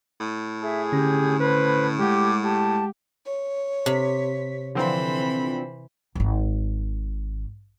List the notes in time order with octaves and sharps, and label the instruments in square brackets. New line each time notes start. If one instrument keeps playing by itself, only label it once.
[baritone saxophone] A2
[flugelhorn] G#4 [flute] E5
[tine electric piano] D3 C#4 [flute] G4
[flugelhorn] B4 [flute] C5
[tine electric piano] G#3 F#5 [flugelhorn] G4 [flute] D6
[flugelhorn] G4 [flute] A5
[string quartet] C#5
[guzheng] C3 [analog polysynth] B6
[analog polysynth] D3 F3 C4 [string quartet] E3 C5 B5
[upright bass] D1 G#1